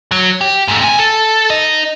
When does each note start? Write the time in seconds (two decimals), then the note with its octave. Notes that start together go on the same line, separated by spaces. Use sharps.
0.11 F#3
0.41 G4
0.68 G#2 A3
0.81 C3 G#5
0.99 A4
1.50 D#4 D#5